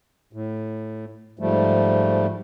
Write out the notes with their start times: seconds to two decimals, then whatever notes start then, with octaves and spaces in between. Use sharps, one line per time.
0.33 A2
1.39 G#2 F3 G3 A3